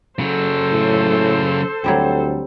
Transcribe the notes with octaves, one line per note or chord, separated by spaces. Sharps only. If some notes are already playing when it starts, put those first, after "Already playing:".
C#3 F#3 A4 C5
A2
D2 F#3 G3 C4